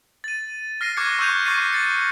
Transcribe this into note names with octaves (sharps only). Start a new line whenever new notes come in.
A6 D#7
F6 A#6 C7 D#7
C#6 D6 F#6 G#6 C7 C#7
C#6 E6 F#6 G6 D#7 F7
C#6 A6 C7
A6 C#7